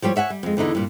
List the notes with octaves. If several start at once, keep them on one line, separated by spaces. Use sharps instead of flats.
F3 G3 G4 G#4 C#5
C#5 E5 F#5 G#5
G3
F2 G#3
E2 D3 D#4 E4
G2 A#2